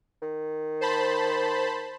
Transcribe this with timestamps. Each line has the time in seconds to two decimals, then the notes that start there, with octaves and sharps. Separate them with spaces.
0.22 D#3
0.81 C5 A5 B5